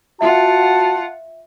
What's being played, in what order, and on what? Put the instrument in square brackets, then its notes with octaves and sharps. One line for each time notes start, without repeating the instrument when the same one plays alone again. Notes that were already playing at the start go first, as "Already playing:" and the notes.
[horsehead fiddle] F4 F#5 [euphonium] F#4 [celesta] E5 [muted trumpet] A5